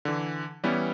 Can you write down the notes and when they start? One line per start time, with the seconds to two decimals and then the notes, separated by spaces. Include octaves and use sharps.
0.05 D3 E3
0.63 E3 G3 B3 C#4 E4